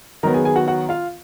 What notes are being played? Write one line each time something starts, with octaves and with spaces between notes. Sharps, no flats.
D#3 F#3 B3 A#4 A#5
G#4 G#5
G#4 G#5
F#4 F#5
F#4 F#5
F4 F5